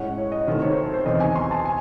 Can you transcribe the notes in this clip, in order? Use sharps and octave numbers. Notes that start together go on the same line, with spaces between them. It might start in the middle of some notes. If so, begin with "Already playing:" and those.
Already playing: A2 G#3 C#4 F#5
C#5
D#5
C3 D#3 A3 C4 C#5
C#5
C5
A4
C5
E2 C3 D#3 D#5
G#5
C6
A5
G#5